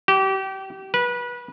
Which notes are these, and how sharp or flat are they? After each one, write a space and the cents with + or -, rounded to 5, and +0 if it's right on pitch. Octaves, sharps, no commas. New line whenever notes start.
G4 -30
B4 -25